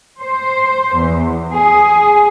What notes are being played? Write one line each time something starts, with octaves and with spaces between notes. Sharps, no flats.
C5
E2
G#4